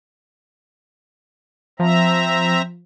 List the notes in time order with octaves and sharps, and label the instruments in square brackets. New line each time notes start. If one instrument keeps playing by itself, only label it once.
[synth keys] F3 [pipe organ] C4 E5 A#5